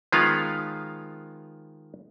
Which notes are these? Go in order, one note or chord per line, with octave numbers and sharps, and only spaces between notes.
D#3 F3 G#3 B3 F4 F5